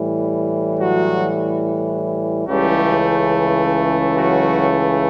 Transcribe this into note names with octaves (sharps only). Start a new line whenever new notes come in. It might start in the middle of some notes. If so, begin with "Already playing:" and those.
Already playing: A2 E3 G3
F#3 F#4
C#2 C#3 E3 G3 A3 G4
F#3 F#4